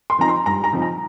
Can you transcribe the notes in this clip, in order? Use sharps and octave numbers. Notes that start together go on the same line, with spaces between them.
C6
F3 C4 D#4 A#5
C6
G2 A#5
A#5
F3 C4 D#4
A#5